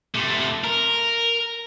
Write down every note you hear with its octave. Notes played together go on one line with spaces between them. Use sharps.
C3 A3
A#4